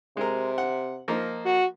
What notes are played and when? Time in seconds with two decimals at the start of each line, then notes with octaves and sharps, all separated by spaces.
0.17 C3 G#3 A#4
0.58 F#5
1.08 F3 A#3 D#4
1.45 F#4